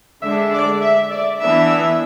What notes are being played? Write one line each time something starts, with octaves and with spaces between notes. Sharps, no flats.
D3 G#3 D4 E5
D5
E5
D5
E3 B3 D4 E5